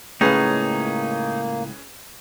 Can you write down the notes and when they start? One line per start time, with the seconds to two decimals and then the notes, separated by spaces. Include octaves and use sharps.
0.21 C#2 A2 A#3 C#4 D#4 G#4 B4